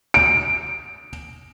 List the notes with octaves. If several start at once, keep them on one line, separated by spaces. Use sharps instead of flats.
D7